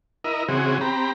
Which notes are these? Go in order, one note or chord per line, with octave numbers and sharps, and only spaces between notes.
E4 A#4 D#5
C#3 E3 C4 F#4 G#4
C4 G4 A#5 B5